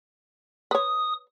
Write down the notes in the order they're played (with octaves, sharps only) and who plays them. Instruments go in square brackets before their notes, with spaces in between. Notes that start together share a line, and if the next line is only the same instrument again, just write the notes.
[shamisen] B4 C#5 [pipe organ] D#6